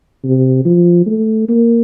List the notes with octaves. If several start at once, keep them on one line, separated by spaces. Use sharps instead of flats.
C3
F3
A3
A#3